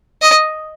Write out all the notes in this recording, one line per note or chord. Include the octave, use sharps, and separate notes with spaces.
D#5